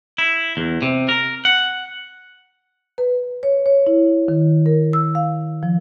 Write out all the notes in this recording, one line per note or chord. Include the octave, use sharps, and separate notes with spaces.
E4
E2
C3
A#4
F#5
B4
C#5
C#5
E4
D#3
A#4
E6
F5
F3